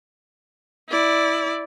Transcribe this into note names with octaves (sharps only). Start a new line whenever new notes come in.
E4 D5